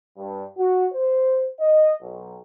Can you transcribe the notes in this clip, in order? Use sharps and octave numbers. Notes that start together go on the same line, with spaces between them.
G2
F#4
C5
D#5
B1